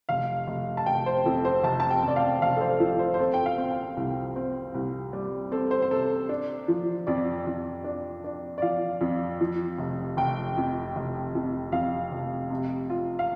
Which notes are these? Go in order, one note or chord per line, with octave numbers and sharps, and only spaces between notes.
F1 F5
F1
A5
F1 G5
C5
F2 A4
C5
F1 A5
A5
G5
F1 D5
F5
F1 F5
A4
C5
F3 A4
C5
C5
C4 A4
G5
F5
C4
G5
C2
C4
C2
G3
C4 A4
C5
C5
C3 A4
D4
F3
F2 D5
F2
D4
D4
D5
F3 F5
F2
F3
F1
F1 G5
F2
F1
F2
F2 F5
F1
C3
F4
F5